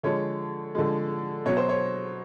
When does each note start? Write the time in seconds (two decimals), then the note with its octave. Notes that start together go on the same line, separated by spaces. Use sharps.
0.03 D3 F3 G#3 C#5
0.75 D3 F3 G#3
1.45 B2 F#3 C#5
1.57 C5
1.69 C#5